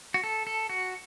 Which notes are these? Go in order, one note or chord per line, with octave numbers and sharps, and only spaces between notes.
F#4
A4
A4
F#4